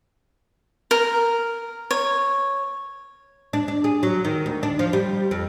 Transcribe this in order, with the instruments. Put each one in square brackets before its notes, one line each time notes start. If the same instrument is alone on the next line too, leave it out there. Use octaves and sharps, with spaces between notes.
[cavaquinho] A#4
C#5
[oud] D4
D4
G#4
F#3
D#3
D2
D4
F3
G3
F2